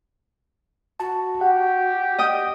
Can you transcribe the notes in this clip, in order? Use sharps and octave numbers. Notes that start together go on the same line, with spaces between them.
F#4 A5
G4 F#5
D#5 G5 D#6